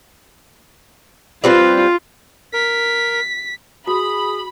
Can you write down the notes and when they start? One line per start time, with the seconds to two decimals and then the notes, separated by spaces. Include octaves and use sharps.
1.44 G3 C4 F4 B4
2.53 A#4 B6
3.87 F#4 G#4 B5 D#6